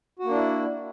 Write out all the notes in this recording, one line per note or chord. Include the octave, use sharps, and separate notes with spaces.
A#3 D4 E4 F#4